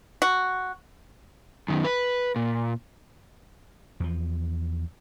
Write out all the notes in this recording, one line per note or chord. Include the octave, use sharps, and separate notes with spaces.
F#4
F#2 D#3
B4
A#2
E2 F3